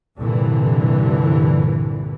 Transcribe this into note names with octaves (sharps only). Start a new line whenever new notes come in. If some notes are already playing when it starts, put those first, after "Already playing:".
C2 G2 A#2 D3 E3